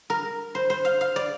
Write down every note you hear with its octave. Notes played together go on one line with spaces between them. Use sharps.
A#4
C5
C5
F5
F5
D5